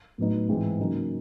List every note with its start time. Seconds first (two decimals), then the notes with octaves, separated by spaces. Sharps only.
0.18 A2 F#3 B3 D#4
0.49 G#2 E3 G#3 C4
0.79 C#3 F#3 A#3 D#4